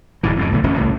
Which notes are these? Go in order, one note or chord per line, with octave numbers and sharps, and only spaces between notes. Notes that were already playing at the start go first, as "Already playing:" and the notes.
D1 G2 E3
F2 G#2 C#3
B1 A2 D3
E1 A1 B2 C#4
C2 A2